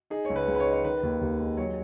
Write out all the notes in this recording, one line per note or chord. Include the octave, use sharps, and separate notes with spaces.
D#4 G#4
C#2 C#5
B4
C#2
B4
C#5
D#4
C#5
D#3 B4
D#2
D#2
G#3
F#3 C#5